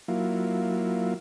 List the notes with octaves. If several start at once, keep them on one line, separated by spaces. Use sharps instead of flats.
F#3 A#3 E4 F4